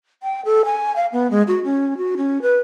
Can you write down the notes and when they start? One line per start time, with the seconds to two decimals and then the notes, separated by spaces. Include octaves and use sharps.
0.23 G5
0.45 A4
0.65 G#5
0.96 F5
1.12 B3
1.31 G#3
1.48 F#4
1.64 C#4
1.97 F#4
2.17 C#4
2.42 B4